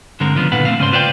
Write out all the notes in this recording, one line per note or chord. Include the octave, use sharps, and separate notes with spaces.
G2 D3 G#3 C4 A#4
C#3 F3 B3 D4
A#2 D3 E4 B4 F5 F#5
A3 A#3 C4 F5
G#2 C#3 C#4 C5 D5 C6
F4 B4 C5 D5 F5 G5